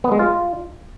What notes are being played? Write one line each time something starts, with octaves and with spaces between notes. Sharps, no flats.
B3
G#3
F4